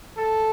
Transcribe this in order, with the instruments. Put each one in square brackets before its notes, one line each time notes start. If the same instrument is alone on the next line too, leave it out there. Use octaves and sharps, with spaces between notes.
[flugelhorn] A4